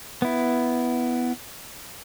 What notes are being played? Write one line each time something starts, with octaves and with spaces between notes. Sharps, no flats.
B3 E4